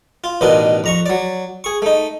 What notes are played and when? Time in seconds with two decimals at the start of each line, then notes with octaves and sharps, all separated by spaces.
0.24 F4
0.41 A1 B2 D#3 D4 D#4 A#4
0.84 F2 A#5 C#6
1.06 F#3 D5
1.64 G#4 C#6
1.82 A3 D#4